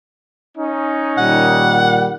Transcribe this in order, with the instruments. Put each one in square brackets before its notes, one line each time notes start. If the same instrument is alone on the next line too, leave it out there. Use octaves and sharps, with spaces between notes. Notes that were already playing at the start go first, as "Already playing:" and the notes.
[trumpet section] C#4 D#4
[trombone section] A#2 D#3 G3 [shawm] F#5